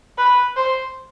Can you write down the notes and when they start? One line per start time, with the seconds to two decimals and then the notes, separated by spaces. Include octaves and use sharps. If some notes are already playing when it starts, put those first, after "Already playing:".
0.18 B4
0.56 C5